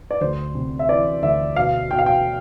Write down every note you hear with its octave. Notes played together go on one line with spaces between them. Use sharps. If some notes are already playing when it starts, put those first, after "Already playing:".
D5
D2 C5
C3
E5
E3 D5
D2 E5
B2 F5
B2 G5
F5
G5